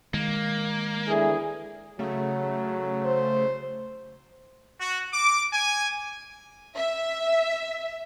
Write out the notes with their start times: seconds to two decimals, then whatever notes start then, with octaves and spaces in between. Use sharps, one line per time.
0.14 D#3 G#3 A#3
1.08 E2 D3 E3 G#4
1.99 C#3 F#3 A3
3.06 C5
4.81 F#4
5.13 D6
5.53 G#5
6.76 E5